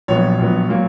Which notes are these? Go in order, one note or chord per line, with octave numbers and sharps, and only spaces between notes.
A#1 A#2 F#3 B3 C#5
A#1 A#2 F#3 B3
A#2 F#3 A#3